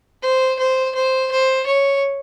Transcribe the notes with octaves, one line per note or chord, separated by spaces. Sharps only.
C5
C5
C5
C5
C#5